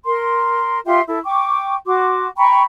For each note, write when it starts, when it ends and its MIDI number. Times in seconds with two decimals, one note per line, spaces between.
0.05 0.79 70
0.05 0.79 84
0.85 1.01 65
0.85 1.01 67
0.85 1.01 76
0.85 1.01 84
1.08 1.19 64
1.08 1.19 69
1.24 1.75 79
1.24 1.75 85
1.24 1.75 86
1.86 2.28 66
1.86 2.28 84
1.86 2.28 86
2.38 2.63 79
2.38 2.63 82
2.38 2.63 83
2.38 2.63 85